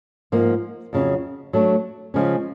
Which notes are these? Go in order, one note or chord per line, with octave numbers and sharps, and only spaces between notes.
G#2 F3 A#3
F2 C#3 F#3
F#3 A3 D4
C#3 F3 G#3 C#4